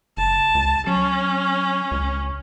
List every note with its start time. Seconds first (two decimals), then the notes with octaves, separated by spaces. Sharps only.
0.17 F#1 A5
0.55 C#2
0.87 F#3 C#4
1.91 C#2